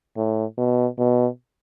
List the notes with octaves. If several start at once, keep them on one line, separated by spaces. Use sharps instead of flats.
A2
B2
B2